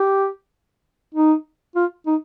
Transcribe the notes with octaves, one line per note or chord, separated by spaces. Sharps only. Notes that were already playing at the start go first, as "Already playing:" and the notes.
Already playing: G4
D#4
F4
D#4